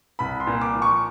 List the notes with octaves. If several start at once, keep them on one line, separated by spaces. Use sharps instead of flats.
C2 B5
C6
A#2
D6
F3
C#6